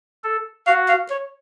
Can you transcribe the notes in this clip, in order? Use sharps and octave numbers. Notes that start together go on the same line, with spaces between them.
A4
F#4 F5
F5
C#5